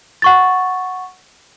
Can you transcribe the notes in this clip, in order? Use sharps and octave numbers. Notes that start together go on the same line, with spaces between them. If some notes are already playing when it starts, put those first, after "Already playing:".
F#5 C#6 A6